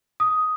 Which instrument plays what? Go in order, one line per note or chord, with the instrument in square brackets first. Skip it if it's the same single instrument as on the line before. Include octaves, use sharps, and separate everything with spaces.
[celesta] D#6